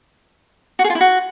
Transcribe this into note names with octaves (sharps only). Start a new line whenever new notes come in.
F#4
G#4
F4
E4
F#4